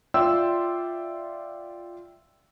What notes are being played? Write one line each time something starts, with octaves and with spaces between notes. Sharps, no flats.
F4 D5 E5 G5 C6 E6